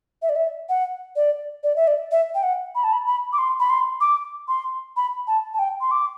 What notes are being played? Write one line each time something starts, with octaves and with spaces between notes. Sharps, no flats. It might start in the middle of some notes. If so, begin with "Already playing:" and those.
E5
D5
E5
F#5
D5
D5
E5
D5
E5
G5
F#5
B5
A5
B5
B5
D6
C6
B5
C6
D6
C6
B5
A5
A5
G5
C6
D6